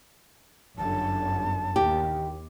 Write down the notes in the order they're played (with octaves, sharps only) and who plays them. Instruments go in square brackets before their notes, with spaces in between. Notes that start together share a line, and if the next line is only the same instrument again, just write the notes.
[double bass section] G1 F#2 D3 [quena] A5
[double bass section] D#2 [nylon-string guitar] G4